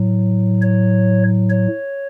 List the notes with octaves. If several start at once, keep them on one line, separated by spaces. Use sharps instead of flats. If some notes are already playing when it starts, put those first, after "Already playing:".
Already playing: A2 F#3
C#5
C#5